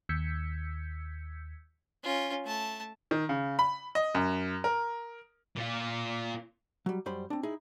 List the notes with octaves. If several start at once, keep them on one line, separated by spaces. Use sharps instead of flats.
D#2 E6 G6 G#6 B6 C#7
C#4 F4
A3 A5
D#3
C#3
B5
D#5
F#2
A#4
A#2 F4
F#3 G3
F#2 G3 C5 B5
C4 D4
D#4 E4 G#4